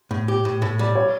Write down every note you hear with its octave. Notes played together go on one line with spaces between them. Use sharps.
A2
G4
A2
A2
G3
C#5